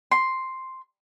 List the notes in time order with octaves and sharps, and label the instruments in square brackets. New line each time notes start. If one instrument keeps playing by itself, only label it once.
[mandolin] C6